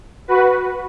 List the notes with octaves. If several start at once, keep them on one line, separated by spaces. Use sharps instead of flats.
F#4 B4